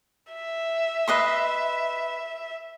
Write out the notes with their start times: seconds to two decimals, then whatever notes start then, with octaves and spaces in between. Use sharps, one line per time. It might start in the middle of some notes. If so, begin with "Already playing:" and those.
0.33 E5
1.08 B4 D#5 C6